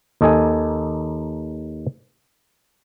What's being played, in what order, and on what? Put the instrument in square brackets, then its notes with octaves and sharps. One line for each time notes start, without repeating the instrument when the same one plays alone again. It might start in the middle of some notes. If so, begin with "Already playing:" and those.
[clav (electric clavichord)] D#2 D#4 A4 D#5 G#5